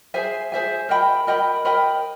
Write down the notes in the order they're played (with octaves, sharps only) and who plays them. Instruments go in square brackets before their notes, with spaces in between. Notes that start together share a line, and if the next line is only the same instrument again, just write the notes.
[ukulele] G#4 C5 E5 G#5
G#4 C5 E5 G#5
A#4 D#5 G5 B5
A#4 D#5 G5 B5
A#4 D#5 G5 B5